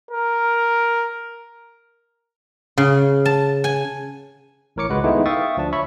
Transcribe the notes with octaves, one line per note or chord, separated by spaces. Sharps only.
A#4
C#3
A5
G#5
A1 A2 A#4 C#5 D6 C#7
C#2 G#3 F#4 B4
D#3 G#3 A3 B3 D#4 E4
E5 F5 G5 C#6 D#6 A6
D2 F3 D4 A5
C#5 E5 B5 C#6